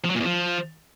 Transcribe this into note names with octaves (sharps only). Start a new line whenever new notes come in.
F3
F#3
A#2
E2
F3